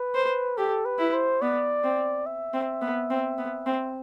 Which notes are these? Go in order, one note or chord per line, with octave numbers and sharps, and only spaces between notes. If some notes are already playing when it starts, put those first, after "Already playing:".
Already playing: B4
C5
G4 A4
B4
E4
C5
B3 D5
C4
E5
C4
B3
C4
B3
C4